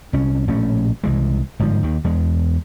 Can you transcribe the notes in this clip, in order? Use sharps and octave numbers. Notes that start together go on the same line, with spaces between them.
C2 C#4
A#1 A2 A3 C#4
C2 E3 G#3
G1 G#2 F3
D#2 D#3
E2 G#3